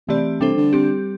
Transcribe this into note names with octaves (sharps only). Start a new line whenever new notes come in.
C3 E3 A3 C4 G4 D5
C3 G3 D4 A4 C5
D3
G3 C4 G4